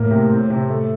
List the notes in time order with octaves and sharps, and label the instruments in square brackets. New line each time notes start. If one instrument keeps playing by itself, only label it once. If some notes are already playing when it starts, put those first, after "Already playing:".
Already playing: [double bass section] A2 [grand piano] A#3
[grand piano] C3
C4
C3
A3